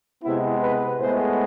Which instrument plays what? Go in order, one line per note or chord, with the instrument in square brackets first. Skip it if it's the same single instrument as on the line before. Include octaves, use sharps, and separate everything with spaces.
[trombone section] C3 G#3 B3 E4
B4
A2 G#3 B3 C5